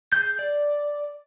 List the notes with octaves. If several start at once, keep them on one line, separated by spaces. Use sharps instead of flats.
G#4 G6
D5